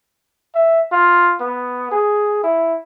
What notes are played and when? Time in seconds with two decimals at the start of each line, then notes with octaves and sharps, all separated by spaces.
0.55 E5
0.92 F4
1.40 B3
1.91 G#4
2.43 E4